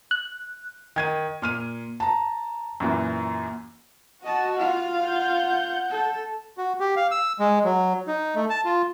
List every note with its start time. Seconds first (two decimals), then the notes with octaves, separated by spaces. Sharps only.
0.11 F#6
0.96 D#3 G#6 D#7
1.42 A#2 F6 D#7
2.00 A5 A#5
2.80 F#2 A#2 E3
4.24 F#4 D#5 A5
4.58 F4 F5
5.03 F#5 G6
5.89 A4
6.58 F#4
6.80 G4
6.96 F5
7.11 E6
7.40 G#3
7.65 F#3
8.08 D#4
8.35 A3
8.50 A5
8.65 F4